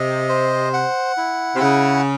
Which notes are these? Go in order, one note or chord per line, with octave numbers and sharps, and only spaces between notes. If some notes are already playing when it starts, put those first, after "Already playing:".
Already playing: C3 D#5
C5
F#5
E4
C3
C#3 F#5